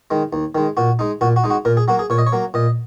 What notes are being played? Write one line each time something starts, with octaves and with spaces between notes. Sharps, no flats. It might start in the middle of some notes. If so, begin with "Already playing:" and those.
D#3 G#3
D#2
D#3 G#3
A#2 F#4
G#3 D#4
A#2 F#4
F#4
G#3 D#4
F#4
A#2 A#4
G#4
F#3 A#3 F#4
G#4
A#2 C#5
D#5
C#5
F#3 A#3
A#2 D#5